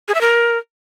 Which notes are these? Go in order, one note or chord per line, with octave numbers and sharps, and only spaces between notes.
G#4
E5
A#4